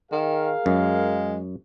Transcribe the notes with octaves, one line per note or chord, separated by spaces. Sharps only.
D#3 G#4 A#4 F5
F#2 G#3